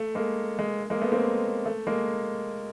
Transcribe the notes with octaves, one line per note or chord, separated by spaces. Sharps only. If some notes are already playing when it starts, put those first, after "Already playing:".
Already playing: A3
G#3 A#3
G#3
G#3 A#3
A3 B3
A#3 C4
A3
G#3 A#3